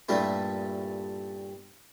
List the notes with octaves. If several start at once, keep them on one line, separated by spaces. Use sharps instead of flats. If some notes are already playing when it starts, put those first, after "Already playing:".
G2 A#2 G3 A3 E4